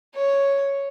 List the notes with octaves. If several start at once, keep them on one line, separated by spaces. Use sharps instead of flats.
C#5